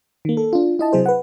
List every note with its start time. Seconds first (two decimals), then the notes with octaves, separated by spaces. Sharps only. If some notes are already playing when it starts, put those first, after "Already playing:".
0.25 D#3 A#3
0.37 A4
0.53 D4 F4
0.79 E4 D#5 A5
0.93 C3 F#3 G#4 C5
1.06 B4 F#5